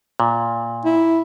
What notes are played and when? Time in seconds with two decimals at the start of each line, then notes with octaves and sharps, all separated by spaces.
0.20 A#2
0.85 E4